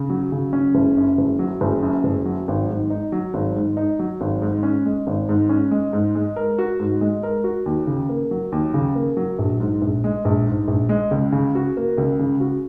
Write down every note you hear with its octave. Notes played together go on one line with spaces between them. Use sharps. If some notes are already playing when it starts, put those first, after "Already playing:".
Already playing: C#3
F#3
C#3
C#4
F#1
F#2
F#1
F#3
F#1
F#2
F#1
F#3
G#1
G#2
D#4
F#3
G#1
G#2
D#4
F#3
G#1
G#2
C#4
G#3
G#1
G#2
C#4
G#3
G#2
G#3
A#4
F#4
G#2
G#3
A#4
F#4
D#2
C#3
A#3
F#3
D#2
C#3
A#3
F#3
A#1
G#2
A#1
G#3
A#1
G#2
A#1
G#3
C#2
C#3
F#4
A#3
C#2
C#3
F#4